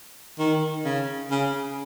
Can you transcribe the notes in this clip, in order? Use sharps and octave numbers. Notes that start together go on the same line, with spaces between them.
D#3
C#3
C#3